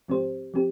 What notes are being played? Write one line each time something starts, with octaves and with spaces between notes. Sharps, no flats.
G#2 F3 C4 G4 C5
F3 C4 G4